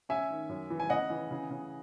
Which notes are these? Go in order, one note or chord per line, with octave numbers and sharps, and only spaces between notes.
C#4 E5 G#5
D#3
F#2
E3
G#5
C#3 D#5 F#5
E3
C#3
C#3